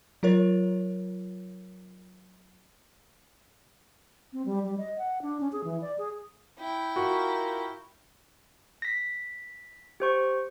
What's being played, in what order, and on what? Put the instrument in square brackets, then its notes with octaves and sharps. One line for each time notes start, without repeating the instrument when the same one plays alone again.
[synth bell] F#3 F4 A#4 C#5
[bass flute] C4
G3
G3
D#5
F#5
D4
C#4
G#4
E3
D5
G#4
[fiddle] E4 G5
[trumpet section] F4 A#4 [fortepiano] F#4
[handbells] A#6 B6
G4 C5 C#6